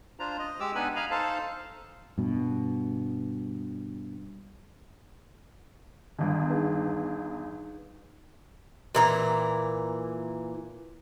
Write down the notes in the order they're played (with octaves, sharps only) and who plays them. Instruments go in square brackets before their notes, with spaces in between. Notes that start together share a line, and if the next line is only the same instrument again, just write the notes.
[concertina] D4 F4 C5 A#5
D#5
G#3 G4 D6 E6
B3 D4 D#4 B4 G#5 B5
D#5 F5 G#5 A#5 B5
D#4 A4 C5 F5 A5
[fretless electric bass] G2 B2
[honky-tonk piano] G1 E2 [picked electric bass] D3 D#3 G3
[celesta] D#4 G#4 B4
[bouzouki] A#2 E3 A#5